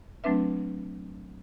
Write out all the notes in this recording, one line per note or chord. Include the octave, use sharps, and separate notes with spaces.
F#3 A3 C4 D4 B4 E5